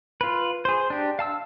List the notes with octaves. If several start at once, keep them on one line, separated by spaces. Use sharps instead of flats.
F4 B4
G#4 C5
D4 G4
F5 A5 E6